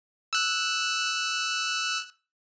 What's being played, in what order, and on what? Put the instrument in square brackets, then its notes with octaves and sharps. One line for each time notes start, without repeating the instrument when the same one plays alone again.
[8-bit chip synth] E6 F#6